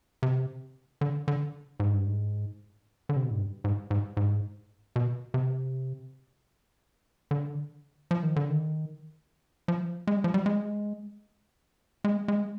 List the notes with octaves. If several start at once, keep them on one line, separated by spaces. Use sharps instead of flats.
C3
D3
D3
G#2
G2
G#2
D3
C3
B2
G#2
G2
G#2
G#2
G#2
B2
C3
D3
F3
D#3
D3
D#3
F3
G#3
G3
F3
G3
G#3
G#3
G#3